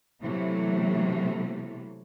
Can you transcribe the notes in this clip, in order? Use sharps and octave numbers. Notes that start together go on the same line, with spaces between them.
C3 E3 F#3 A3 A#3